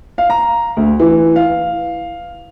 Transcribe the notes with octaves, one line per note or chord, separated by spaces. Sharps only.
F5
A#5
D2
E3
F5